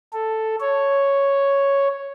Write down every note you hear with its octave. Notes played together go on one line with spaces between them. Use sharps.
A4
C#5